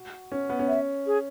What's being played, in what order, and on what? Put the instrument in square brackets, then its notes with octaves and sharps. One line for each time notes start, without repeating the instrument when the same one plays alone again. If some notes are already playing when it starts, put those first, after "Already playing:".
Already playing: [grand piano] F#4
C#4
B3
C#4
[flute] E5
G#4